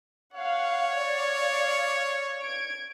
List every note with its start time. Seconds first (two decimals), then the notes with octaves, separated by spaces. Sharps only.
0.34 C#5 F5 F#5
0.95 D5 F5
2.43 G#6 D7